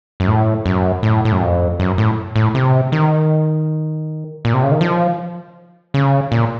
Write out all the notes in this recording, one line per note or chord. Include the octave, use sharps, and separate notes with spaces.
F#2
A2
F#2
A2
A2
F#2
F2
F#2
A2
A2
C3
D#3
A#2
C3
C#3
D#3
F3
C#3
A#2